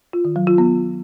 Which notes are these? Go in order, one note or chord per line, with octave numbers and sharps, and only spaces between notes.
F4
D#3
F#3
F4
B3